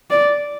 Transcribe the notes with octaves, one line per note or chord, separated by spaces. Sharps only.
D5